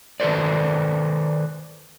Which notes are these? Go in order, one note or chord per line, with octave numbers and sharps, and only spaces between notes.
D#3 A4 B4 C5 D5